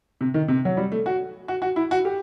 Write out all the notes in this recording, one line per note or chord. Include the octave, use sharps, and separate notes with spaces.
C3
D#3
C3
F#3
G3
A3
F#4
F#4
F#4
E4
F#4
G4